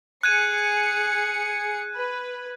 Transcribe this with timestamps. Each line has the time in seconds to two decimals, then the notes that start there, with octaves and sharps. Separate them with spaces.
0.23 G#4 F#6 G#6 C#7 D#7
1.96 B4